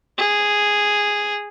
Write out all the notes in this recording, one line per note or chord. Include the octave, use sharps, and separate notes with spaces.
G#4